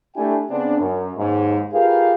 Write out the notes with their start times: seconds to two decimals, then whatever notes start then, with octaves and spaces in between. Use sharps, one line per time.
0.15 A3 D4 E4 G4 G5 G#5
0.50 C#3 B3 C4 D4
0.79 F#2
1.17 D#2 G#2
1.73 F4 G4 G#4 A#4 B4 F5